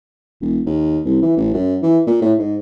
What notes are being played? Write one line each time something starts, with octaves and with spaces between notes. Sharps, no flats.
E1
D#2
C2
E3
A1
F#2
E3
A#2
A2
G#2